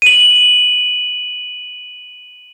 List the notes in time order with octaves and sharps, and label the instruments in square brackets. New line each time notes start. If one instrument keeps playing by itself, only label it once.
[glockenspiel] D#7 F#7